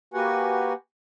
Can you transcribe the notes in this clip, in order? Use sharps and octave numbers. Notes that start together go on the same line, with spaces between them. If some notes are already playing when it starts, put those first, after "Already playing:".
A#3 F#4 G4 B4 F#5 G#5